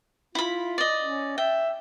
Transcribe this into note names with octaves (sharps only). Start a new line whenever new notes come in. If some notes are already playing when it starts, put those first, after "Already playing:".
E4 F4 B5
D5 D#5
C#4
E5 G5